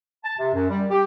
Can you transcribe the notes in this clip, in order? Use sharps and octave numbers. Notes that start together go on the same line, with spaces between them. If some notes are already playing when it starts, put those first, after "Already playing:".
A5
C3
F#2
G3
G4